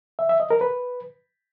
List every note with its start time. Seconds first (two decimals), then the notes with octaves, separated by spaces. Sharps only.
0.19 E5
0.29 E5
0.40 D#5
0.50 A#4
0.61 B4